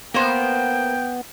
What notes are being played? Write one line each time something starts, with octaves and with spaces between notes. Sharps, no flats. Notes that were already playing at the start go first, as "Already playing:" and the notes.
A#3 B3 C5 G5